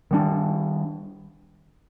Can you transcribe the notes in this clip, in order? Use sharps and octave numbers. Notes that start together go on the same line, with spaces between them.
D#3 G3 B3 D4